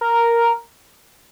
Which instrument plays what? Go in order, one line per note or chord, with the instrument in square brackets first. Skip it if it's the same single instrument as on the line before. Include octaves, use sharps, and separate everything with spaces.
[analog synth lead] A#4